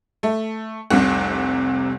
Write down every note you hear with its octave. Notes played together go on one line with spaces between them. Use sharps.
A3
F1 C2 C3